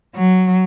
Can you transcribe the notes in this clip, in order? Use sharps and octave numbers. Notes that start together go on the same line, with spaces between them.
F#3